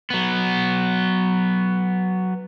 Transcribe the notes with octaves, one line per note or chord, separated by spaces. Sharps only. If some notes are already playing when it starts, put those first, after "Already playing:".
F#3 B3